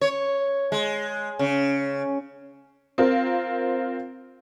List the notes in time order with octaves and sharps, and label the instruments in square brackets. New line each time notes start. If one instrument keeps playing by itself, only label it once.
[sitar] C#5
G#3
C#3
[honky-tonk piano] C4 F4 A#4